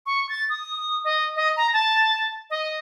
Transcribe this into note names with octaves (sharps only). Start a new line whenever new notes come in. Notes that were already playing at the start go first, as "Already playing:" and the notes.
C#6
A6
D#6
D#5
D#5
A#5
A5
D#5